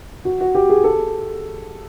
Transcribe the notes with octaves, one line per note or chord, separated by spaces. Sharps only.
F#4
F#4
G4
G#4
A4